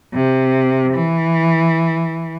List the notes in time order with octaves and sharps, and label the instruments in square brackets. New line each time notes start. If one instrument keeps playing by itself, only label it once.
[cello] C3
E3